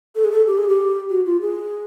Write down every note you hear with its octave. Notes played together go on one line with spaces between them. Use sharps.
A4
G#4
A4
G4
G#4
G4
F#4
F4
G#4